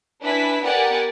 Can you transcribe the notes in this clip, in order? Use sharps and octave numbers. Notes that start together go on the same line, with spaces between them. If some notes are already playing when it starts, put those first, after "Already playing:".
D4 E4 B4 G#5 B6
B3 G4 A#4 D5 F#5 G#5